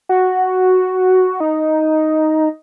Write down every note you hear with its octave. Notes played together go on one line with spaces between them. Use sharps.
F#4
D#4